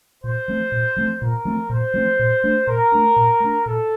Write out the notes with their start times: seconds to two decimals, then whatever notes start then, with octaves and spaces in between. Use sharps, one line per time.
0.23 A#2 C5
0.48 F3 A3 C4
0.72 A#2
0.96 F3 A3 C4
1.21 A#2 A#4
1.45 F3 A3 C4
1.69 A#2 C5
1.94 F3 A3 C4
2.19 A#2
2.44 A3 D4
2.67 A#2 A#4
2.92 A3 D4
3.16 A#2
3.40 A3 D4
3.65 A#2 A4